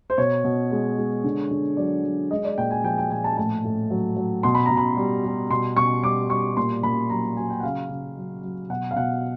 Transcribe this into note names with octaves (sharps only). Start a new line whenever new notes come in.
C5
B2 C#5
B2
G#3
G#3
D3
D3
F#3 D5
F#3
G#3 D#5
D5
A#2 G5
G#5
F3 G5
G5
A#2 G#5
A5
A2 A5
A2
F#3
F#3
B2 C6
B5
A#5
B2
B5
G3
G3
B2 C6
B2 C#6
G3 D6
G3 C#6
A#2 C6
A#2 B5
F#3 A#5
F#3 G#5
G5
F#5
C#3 F5
C#3
F#3
F#3
B2 F#5
F5
B2 F#5